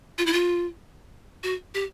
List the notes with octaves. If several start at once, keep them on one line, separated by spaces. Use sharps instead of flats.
F4
E4
F4
F#4
G4